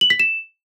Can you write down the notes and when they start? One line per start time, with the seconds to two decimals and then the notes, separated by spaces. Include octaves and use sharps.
0.01 F#7
0.10 B6
0.20 E7